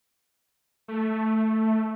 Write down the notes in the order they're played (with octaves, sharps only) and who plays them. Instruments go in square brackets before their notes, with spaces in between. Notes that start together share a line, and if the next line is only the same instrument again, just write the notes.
[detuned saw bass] A3